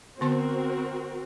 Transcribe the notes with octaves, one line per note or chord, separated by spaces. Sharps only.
D3 B3 C4 F#4 A#4 C6